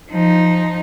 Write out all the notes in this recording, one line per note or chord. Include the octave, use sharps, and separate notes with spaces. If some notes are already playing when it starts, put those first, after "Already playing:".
F3 D#4